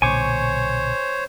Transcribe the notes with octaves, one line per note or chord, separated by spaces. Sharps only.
B1 A#2 D3 C5 C#5 G#5 C#6 D6